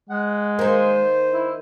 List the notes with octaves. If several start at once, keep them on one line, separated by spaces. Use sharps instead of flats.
G#3 F#5
D#3 A#3 C5
E4